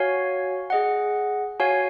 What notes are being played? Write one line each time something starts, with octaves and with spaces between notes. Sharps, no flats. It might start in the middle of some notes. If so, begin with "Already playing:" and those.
Already playing: F#4 C#5 F5 G#5
G#4 D#5 F#5
F#4 C#5 F5 G#5